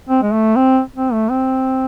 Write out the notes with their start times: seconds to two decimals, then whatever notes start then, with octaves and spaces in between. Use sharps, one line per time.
0.09 C4
0.23 G#3
0.33 A3
0.56 C4
0.96 C4
1.13 A3
1.30 C4